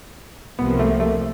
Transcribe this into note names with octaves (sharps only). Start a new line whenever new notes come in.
C2 C3 F3 A#3 B3
A3
A3